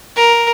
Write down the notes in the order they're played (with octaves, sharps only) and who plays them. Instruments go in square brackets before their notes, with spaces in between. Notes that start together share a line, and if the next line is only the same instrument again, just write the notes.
[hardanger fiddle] A#4